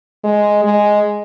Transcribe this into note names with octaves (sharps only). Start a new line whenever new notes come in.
G#3
G#3